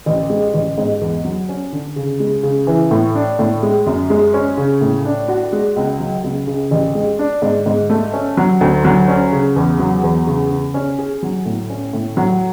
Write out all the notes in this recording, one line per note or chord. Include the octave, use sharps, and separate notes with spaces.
A1
G#3
A1
G#2
E2
F#3
C#4
D3
C#3
G#3
C#3
E3
A2
D4
A2
G#3
F#2
G#3
C#4
C#3
A2
D4
F#4
G#3
C#2
F#3
C#2
C#3
A1
G#3
D4
G#2
G#2
A3
C#4
F#3
D2
F#3
C#4
C#3
E2
F#3
E2
C#3
C#3
C#4
G#4
F#3
A2
C#4
A2
F#3